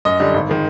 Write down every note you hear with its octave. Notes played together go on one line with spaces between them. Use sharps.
F#2 D#5
D3 G3
G#1
D#3 G#3